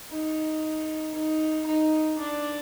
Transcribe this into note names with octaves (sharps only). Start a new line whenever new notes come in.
D#4
D#4
D#4
D4